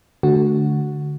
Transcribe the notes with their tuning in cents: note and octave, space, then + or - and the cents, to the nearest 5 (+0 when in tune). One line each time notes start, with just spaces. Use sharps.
D3 +0 A3 -25 F#4 +0